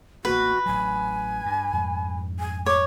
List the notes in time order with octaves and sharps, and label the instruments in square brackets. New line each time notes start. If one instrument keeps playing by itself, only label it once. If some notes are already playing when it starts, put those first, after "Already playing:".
[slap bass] A1 A#3 B3 [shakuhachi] F#4 [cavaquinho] B4
[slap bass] A1 F#3 [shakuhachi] G#5
[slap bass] G2
F2 G#2
[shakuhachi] G#5
[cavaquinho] C#5 [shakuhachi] D6